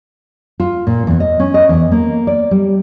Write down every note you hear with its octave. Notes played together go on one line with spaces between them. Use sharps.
F4
A#2
E2
D#5
C#4
D#5
E2
A#3
D5
G3